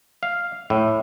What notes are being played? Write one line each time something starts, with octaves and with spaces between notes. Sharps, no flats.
F5
A2